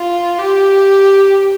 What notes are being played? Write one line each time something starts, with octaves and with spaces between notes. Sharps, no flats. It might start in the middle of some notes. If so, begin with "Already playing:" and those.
Already playing: F4
G4